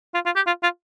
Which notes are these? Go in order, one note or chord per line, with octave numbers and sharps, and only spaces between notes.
F4
F4
G4
F4
F4